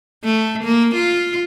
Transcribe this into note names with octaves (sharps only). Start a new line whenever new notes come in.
A3
A#3
F4